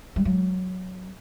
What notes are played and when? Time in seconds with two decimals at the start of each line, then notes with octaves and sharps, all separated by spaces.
0.16 G3
0.25 F#3